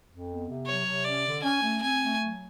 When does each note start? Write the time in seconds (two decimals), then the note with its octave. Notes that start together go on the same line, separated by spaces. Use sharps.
0.10 F2
0.29 B3
0.48 C3
0.66 F#3 C#5
0.86 C3
1.04 C#4 D5
1.25 D3
1.43 C#4 G#5
1.63 A3
1.82 C4 G#5
2.01 A3
2.20 F#3